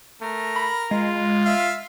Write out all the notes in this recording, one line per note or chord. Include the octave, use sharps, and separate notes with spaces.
A3 A#4
B5
G#3 F4
E5 F5